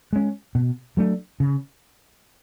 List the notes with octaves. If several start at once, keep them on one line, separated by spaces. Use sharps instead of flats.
G#3 C#4
B2
F#3 A3 D4
C#3